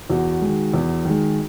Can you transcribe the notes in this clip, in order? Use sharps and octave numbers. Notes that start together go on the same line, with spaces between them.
E2 F#4
D#3 G#3
E2
D#3 G#3